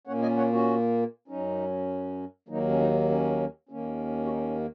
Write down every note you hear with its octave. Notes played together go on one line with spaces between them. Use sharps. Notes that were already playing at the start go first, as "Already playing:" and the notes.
A#2 A#3 C#4 C#5 F#5
D#5 G#5
C#5 F#5
C#4 F#4
F#2 F#3 C#4 D#4
D#2 D#3 F#3 A#3 D#4
C#4
D#4
C#4
D#2 D#3 A#3 C#4
F#4
D#4